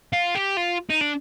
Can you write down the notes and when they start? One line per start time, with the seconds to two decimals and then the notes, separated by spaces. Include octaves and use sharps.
0.13 F4
0.35 G4
0.57 F4
0.90 D#4
1.01 D4